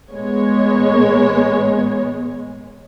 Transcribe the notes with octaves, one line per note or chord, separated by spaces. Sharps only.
A1 G#3 B3 C#5